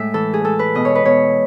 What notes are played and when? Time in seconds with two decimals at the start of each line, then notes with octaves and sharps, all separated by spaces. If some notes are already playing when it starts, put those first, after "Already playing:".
Already playing: A2 G#3 E5
0.14 E3 A4
0.34 G#4
0.44 G#3 A4
0.59 B4
0.75 B2 D#5
0.85 C#5
0.95 B4
1.05 B2 C#5